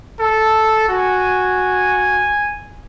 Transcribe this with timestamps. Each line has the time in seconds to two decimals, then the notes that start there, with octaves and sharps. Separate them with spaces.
0.19 A4
0.89 F#4 G#5